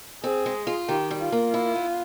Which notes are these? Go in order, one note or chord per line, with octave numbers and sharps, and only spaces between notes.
C4 G#4
G#3
F4
D#3 G4
G3
F4
A#3
E4
B3